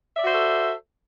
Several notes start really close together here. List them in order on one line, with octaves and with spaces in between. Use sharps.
E5 D5 F#4 C5 A4